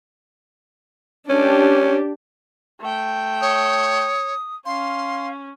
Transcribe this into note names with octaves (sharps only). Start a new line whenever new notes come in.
C#4 D4 G4
A3 G5
C#5 D#6
C#4 F5 C6